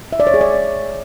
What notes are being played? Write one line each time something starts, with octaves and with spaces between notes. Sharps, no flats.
E5
D5
C#5
G#4
D5